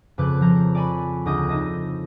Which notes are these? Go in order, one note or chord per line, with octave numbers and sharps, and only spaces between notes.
F2 C#3 B4 D6 F#6 G6
F3 A#5 G6
D5 G#5 B5 C#6
D2 C#3 D#5 D6 D#6 G6
D#4 A4 D#5